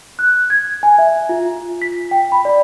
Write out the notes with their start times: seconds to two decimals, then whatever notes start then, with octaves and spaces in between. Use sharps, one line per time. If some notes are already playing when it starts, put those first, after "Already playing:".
0.19 F#6
0.50 G#6
0.83 G#5
0.98 E5
1.29 F4
1.82 B6
2.11 G5
2.32 B5
2.45 D5